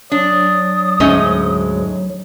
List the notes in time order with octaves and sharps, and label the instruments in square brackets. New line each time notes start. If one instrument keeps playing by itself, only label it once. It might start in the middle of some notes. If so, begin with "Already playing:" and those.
[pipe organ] F#3 [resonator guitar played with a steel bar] D4 [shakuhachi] D#6
[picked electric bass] D2 G#2 [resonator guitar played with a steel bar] A3 C#4 D#5